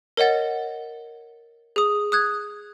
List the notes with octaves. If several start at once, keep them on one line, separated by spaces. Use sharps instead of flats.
A#4 C#5 D#5 F#5 A6
G#4 D#6
D#6 F#6 G#6